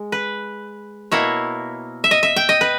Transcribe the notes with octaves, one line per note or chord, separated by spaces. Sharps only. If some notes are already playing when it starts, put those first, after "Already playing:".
Already playing: G#3
B4
B2 A#3 E4 C#5
E5
D#5
E5
G5
D#5
B4